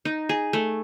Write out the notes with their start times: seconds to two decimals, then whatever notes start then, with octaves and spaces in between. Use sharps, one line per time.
0.05 D#4
0.29 G#4
0.53 A3